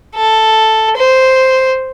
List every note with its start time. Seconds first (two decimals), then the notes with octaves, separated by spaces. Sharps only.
0.16 A4
0.97 C5